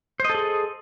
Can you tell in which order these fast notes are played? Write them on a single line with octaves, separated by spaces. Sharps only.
C5 D#5 A4 G#4